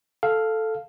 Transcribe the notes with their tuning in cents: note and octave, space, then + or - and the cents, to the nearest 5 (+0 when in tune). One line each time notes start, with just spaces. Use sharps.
A4 +0 F5 +0